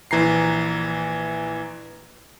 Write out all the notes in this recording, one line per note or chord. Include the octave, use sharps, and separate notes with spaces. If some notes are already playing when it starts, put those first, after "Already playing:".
A#1 E3 A#5 C7